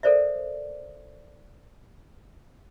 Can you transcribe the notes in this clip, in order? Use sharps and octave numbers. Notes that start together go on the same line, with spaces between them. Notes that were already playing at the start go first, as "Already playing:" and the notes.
A4 A#4 C5 D5 E5